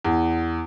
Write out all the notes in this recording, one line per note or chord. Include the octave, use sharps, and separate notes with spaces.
E2